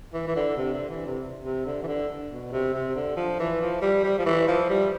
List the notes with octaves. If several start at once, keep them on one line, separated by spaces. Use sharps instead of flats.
E3
E3
D3
C3
D3
E3
C3
C3
D3
E3
D3
B2
C3
C3
D3
F3
E3
F3
G3
G3
F3
E3
F3
G3